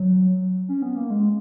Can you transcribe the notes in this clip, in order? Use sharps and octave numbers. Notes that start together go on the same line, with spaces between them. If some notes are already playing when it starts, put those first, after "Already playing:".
Already playing: F#3
C#4
B3
A#3
G#3